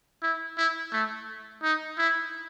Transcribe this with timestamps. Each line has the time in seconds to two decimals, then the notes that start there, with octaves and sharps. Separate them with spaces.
0.22 E4
0.57 E4
0.92 A3
1.63 D#4
1.98 E4